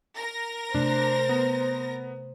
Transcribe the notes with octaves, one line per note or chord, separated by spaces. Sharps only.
A#4 A#6
C3 A3 D4 C5
B3